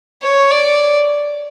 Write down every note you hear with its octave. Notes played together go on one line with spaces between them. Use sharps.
C#5
D5